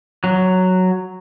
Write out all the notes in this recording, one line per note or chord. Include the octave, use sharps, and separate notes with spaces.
F#3